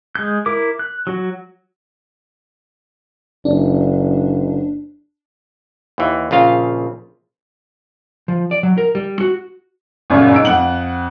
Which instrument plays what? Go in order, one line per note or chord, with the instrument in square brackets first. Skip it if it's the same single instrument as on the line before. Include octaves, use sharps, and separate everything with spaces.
[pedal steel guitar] G#3 G6
E4 A#4 D6
F#6
F#3 F#4
[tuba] F#1 [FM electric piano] D4
[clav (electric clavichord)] D#2 E3
A#1 C#3 F4 F5
[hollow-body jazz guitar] F3
D5
F#3
A#4
G3
F#4
[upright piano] G1 F#2 A#2 C#3 F#3 G3
G#2 D#4 E6 D7
F2 F#5 F#7